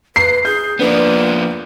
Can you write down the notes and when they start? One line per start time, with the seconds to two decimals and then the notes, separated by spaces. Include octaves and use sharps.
0.16 B4 C7
0.45 G#4 G6
0.79 F3 A#3 B3 D4 B4 D5